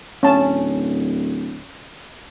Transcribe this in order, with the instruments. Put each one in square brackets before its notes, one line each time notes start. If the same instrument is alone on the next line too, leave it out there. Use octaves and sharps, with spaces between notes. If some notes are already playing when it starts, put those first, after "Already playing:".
[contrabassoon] D1 [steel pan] C#4 A5